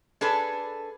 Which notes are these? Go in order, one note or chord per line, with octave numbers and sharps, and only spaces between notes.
D4 G#4 A4 B4